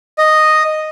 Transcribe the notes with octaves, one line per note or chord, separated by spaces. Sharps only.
D#5